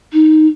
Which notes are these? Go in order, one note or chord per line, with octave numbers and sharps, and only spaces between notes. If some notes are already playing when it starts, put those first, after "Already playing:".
D#4